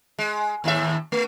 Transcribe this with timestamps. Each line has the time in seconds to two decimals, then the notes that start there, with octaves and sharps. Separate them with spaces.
0.19 G#3
0.64 D#2 A2 E5
1.12 A3